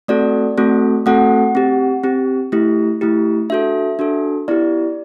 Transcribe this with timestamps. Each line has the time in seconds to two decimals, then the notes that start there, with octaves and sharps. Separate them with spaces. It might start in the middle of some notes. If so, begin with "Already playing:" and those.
0.08 A3 C4 F#4 A4 D5
0.58 A3 C4 F#4 A4
1.06 A3 C4 F#4 A4 F#5
1.55 C4 G4
2.04 C4 G4
2.52 A3 E4 G4
3.01 A3 E4 G4
3.49 D4 F#4 A4 E5
3.99 D4 F#4 A4
4.48 B3 E4 G4 D5